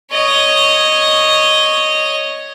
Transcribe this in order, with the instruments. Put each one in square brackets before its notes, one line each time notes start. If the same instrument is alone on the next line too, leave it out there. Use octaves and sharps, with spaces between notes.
[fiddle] C#5 D#5